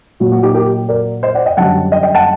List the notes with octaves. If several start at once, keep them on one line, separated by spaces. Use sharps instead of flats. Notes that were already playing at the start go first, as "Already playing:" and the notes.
A#2 F#3 F#4
F#4
D#4 G4
G4 A#4
A#4 D5
C5 D#5
D5 F#5
D#5 G5
F#2 D3 G3 F#5 A5
D#5 G5
D#5 G5
F#5 A5